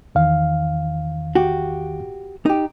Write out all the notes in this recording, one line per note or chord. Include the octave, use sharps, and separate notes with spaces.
E2 D#3 F5
F#4 G4
D#4 G4